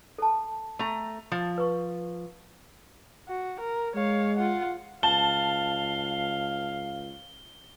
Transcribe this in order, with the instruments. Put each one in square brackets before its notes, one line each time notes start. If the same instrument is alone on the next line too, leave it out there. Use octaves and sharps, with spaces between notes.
[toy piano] A4 A5
[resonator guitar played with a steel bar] A3 A#5
F3
[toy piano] B4 C#6
[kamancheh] F#4
A#4
[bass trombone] G#3 [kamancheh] C#5 F5
[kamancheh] F4 F#5
[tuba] C#2 [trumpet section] F5 [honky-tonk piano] A5 [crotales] G7